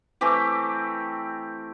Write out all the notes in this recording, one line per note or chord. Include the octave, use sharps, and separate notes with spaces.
E3 A3 C4 G4